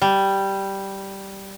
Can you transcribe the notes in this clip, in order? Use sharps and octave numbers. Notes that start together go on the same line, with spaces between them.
G3